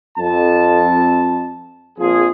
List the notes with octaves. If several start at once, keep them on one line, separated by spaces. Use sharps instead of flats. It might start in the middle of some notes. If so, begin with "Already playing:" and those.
F2 A5
A#1 F2 F3 G#4